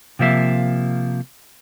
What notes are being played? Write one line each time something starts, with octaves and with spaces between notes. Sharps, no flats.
C3 F3 A#3 E5 F5